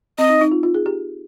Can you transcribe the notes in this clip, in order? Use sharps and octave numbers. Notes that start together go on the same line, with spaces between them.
C4 D#5
D#4
D#4
F4
F4
G#4
G4